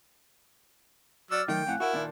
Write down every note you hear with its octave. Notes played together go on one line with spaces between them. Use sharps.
F#3 D5 D6 E6 F6 A6
D#3 F#3 A3 D#4 G5
F2 A2 F5 F#5 G#5 F#6
E4 F#4 A#4
A#2 D#3 D4